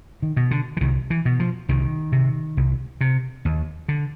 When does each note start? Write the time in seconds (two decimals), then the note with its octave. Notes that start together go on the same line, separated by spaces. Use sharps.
0.22 D#3
0.37 B2
0.51 D3
0.77 E3
0.81 C2 D#3
1.10 E3
1.25 B2
1.40 F3
1.69 C2 D#3
2.12 C3
2.57 C2
3.01 C3
3.45 D#2
3.88 D3